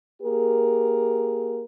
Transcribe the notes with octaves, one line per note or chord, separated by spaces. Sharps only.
A#3 G4 G#4 A#4